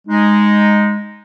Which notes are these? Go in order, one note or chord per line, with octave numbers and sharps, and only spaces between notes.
G#3 D#4